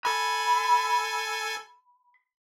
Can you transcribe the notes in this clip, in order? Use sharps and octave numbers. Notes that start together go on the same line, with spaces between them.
A4 G#5 B5